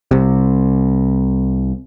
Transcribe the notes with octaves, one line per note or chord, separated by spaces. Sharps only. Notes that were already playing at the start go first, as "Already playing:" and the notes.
C2 C3